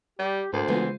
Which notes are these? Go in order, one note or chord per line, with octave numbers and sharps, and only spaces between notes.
G3 G4
D2 G#2 A#4 C5
C#3 E3 G#3 B3 F4